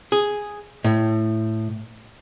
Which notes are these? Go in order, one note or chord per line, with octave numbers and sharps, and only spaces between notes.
G#4
A2